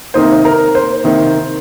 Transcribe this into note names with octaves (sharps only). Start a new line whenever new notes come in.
C3 D#3 A#3 D#4 C5
A#4
C5
C3 D#3 A#3